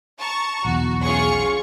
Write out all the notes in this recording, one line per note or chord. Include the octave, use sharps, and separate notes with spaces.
A5 A#5 C#6
B1 E2 F#4
C#4 F4 G#4 C#6